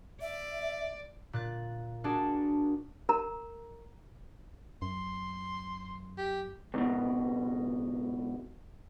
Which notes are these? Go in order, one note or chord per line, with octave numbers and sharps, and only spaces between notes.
D5 E5
A#2 F#6 A6
A#3 D4 F#4 G#4 F#5 A5
A#4 A#5
F#2 C6
G4
C#2 G#2 B2